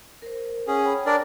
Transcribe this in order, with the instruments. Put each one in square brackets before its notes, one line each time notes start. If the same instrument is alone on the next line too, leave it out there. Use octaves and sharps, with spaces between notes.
[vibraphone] A#4 C5
[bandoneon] C#4 G#4 [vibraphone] F#5
[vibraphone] C#5 G5 B5
[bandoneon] D4 A#4 D5